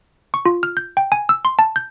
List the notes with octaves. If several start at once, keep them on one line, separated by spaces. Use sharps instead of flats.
C#6
F4
F6
G6
G5
G#5
E6
C6
A5
G6